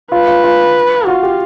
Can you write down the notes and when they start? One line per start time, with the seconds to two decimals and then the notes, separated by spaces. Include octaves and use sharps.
0.12 F4 B4
0.28 F4
0.44 F4
1.07 F4 F#4
1.23 G4